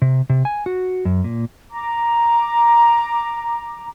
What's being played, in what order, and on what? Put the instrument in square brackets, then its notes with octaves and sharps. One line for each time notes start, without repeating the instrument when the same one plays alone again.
[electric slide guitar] C3
C3
G#5
F#4
F#2
A#2
[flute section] A#5 D6